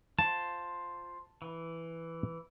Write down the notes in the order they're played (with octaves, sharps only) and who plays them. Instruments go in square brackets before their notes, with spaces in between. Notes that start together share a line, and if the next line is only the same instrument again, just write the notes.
[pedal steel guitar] F4 C5 C6 [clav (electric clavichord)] A5
[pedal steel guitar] E3